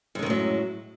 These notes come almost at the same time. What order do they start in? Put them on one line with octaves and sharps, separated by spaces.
F#2 G#3 D#3 A2 F#3